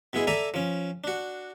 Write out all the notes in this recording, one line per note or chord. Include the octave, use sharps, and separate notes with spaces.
B2 G#3 E4 G#4
A4 D5 E5 G#5 A#5
F3 C#4
D4 F#4